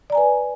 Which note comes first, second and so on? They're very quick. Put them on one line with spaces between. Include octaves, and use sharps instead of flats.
D5 A#5 G#5 B4